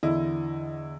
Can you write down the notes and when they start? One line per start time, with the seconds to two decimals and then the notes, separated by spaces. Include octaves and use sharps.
0.03 E2 D3 E4 D#5